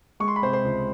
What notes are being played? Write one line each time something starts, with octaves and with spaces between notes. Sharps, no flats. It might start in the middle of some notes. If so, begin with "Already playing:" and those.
G#3 C#6
C6
B5
C3 C5 C6
C5 C6
C#2